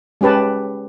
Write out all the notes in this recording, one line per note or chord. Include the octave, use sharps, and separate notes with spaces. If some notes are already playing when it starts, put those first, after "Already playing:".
G#3 C#4 G4 B4 A5